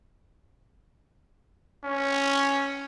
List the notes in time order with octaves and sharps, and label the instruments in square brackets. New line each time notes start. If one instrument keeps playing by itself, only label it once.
[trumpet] C#4